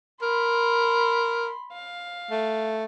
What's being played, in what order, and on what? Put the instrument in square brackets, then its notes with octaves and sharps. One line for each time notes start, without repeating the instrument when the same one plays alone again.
[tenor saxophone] A#4 [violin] B5 C6
[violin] F5
[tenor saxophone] A3